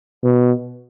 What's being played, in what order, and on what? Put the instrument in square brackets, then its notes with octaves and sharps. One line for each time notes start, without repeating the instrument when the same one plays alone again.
[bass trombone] B2